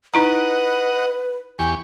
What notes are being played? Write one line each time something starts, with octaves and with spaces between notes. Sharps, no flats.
D#4 E4 B4 D#5 F#5 A#5
E2 G4 G#5 C#6